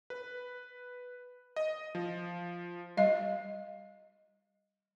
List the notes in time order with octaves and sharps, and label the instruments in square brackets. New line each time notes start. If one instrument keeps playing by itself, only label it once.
[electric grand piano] B4
D#5
F3
[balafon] G3 D#5